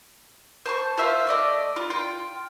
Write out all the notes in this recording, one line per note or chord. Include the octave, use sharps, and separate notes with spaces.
C5 A5 C#6
F4 C5 E5 F5
A3 D5 D#5
F4
F4 G5 C6